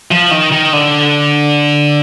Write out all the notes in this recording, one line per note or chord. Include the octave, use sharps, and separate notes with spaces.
F3
D#3
D#3
D3